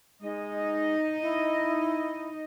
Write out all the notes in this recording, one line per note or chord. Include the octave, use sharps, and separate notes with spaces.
G#3 D#4 D#5
E4